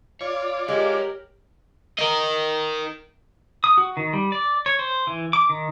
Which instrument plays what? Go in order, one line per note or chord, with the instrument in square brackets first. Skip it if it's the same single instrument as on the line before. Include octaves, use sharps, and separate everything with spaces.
[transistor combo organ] F4 D5 [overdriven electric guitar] C#5
[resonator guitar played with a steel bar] G#3 [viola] G4 A#4 [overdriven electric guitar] C#5 F#5
[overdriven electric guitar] A#4 D#5
[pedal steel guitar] D#6
F#4
D#3
G3
D5
C#5
C5
E3
D6
D#3